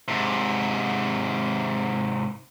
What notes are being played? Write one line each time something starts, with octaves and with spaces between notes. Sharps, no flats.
G#2 C3